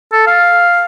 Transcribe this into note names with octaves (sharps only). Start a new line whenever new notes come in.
A4
F5